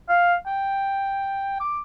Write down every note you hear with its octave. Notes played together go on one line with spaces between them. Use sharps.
F5
G5
D6